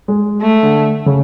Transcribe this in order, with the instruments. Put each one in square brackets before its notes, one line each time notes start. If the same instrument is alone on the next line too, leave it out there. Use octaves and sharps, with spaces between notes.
[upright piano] G#3
[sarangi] A3
[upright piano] D3
C#3